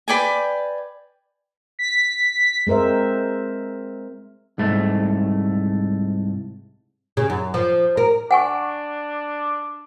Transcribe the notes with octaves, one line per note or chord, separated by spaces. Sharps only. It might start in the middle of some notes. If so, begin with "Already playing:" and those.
B4 D5 G5 G#5
B6
G#3 C4 A#4 C5 E5
C2 G#2 A3
C#3
F#2
F3
A#4
D4 F#5 G#5 C#6